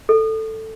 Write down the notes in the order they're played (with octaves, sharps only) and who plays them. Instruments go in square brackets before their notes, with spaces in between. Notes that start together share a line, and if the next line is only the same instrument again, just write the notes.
[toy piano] A4